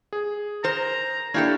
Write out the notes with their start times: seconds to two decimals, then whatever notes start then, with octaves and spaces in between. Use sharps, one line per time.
0.13 G#4
0.64 A#4 C5 A#5
1.34 A#3 D4 E4 G4 A4 C#5